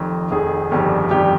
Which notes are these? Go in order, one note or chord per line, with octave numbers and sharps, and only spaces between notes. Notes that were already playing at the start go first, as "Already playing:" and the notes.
Already playing: F1 F2 D#3
F1 F2 D#3 G#4
G1 F2 D#3 G3
G1 F2 D#3 G3 G4